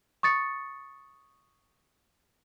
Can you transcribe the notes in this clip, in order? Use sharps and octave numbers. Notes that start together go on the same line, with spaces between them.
C#6 D#6 A6 C#7